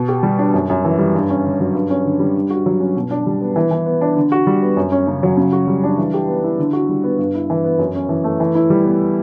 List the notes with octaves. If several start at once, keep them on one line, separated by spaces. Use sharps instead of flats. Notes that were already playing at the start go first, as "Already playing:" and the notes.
Already playing: B2
G4
G3
D4
F#2
F#2
E3
G3
G2
C#4
D3
F#3
G2
C#4
D3
G3
D3
F#4
F#3
C#4
B2
D4
G3
B3
E3
E3
B3
D4
D3
F#4
G3
B3
F#2
C#4
C#3
F#3
C#3
F#4
G3
D4
E3
G4
B3
E4
D3
F#4
G3
B3
G2
E4
E3
B3
F#2
C#4
E3
A3
E3
E4
G3
B3